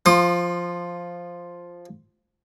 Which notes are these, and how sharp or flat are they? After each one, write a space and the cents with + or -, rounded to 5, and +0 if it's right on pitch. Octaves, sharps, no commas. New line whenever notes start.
F3 +0 C6 +30 D#6 -40